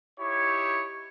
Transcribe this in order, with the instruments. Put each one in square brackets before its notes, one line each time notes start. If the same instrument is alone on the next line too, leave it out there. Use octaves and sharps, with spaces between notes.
[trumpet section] D#4 E4 G4 C#5